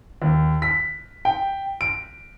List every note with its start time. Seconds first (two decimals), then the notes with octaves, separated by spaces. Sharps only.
0.22 D#2
0.62 B6
1.25 G5
1.81 D7